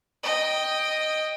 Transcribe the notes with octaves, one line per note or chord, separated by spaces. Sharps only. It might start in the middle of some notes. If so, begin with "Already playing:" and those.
D#5 G5